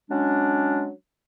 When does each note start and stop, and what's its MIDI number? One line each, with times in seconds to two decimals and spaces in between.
0.10 0.92 54
0.10 0.92 56
0.10 0.92 61
0.10 0.92 62